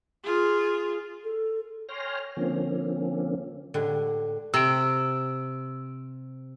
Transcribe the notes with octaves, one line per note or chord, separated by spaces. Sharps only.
F4 G#4
A4
C#5 G5 G#5 C6 F6 A#6
D3 F3 A#3 C4 C#4
A2 D3 G#3 F#4 G4
C3 E6 D7